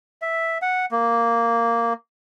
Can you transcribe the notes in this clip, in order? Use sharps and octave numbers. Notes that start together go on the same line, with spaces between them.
E5
F#5
A#3